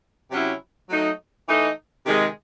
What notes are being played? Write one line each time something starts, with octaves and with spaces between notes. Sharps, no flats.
C3 F#3 C#4 E4
F#3 A3 D#4
E3 A3 D#4
C3 D#3 G#3